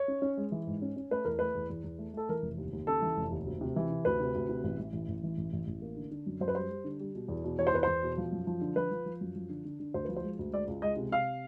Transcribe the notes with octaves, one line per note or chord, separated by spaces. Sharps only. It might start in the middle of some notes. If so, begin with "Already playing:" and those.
Already playing: C#5
C#4
C#4
G#3
E3
G#2
C#4
C#4
A3 B4
E2 A#4
A3 B4
E2
E2
E2
A3
A3 A4
E3 A#4
F1
D#2
D#2
C#3 A4
E3
F1
D#2
D2
C3
E3
C3
D2 B4
C3
D2
C3
A1
E3
A1
A1
E3
A1
A1
A1
A#3
D3
D3
F#2
F#2 C5
B4
G3 C5
G3
D3
G3
B2
E2
B2
E2 C#5
C5
E2 B4
E2 C5
B2
F3
F#2
F3
D3
F3 B4
F3
F3
F#2
F3
D3
D3
D3
D2 C5
F3 B4
C5
G#3
D2
G#3 D5
C#2
G#3 D#5
C3
C3 F5